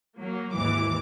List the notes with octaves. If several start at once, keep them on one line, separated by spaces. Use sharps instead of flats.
F#3 A#3
G#1 D#2 G#2 E3 D6